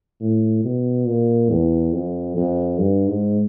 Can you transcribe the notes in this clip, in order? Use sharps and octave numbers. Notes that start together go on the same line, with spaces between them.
A2
B2
A#2
E2
F2
F2
G2
G#2